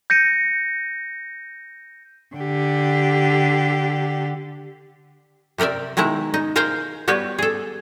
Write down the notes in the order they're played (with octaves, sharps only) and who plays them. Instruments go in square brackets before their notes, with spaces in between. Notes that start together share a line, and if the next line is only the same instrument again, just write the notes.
[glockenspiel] G6 A#6 C#7 D#7
[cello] D3 G4
[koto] C3 G4 A#4 D5 E5
B2 D#3 G#3 E4 A#5
D#4
G#4 A#4 C5 F5 G5 G#5
G3 B3 F#4 G4 B4 C#5
G#4 A4